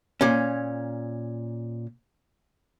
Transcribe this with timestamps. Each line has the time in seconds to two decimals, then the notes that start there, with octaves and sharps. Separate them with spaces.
0.21 A#2 C#4